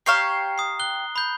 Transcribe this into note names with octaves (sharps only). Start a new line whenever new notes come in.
G4 C#5 F5 A#5 C7
D#6 C7
F#6 G7
B5 G6